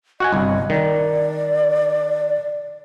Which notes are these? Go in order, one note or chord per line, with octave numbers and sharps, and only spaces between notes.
F#4 D#5 F#5 G#5
G1 C2
D#3 D5